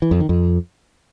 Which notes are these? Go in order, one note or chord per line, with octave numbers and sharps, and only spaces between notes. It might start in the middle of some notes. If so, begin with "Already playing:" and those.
E3
F2
D#3
F2